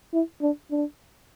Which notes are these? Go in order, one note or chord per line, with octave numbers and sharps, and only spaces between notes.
E4
D4
D4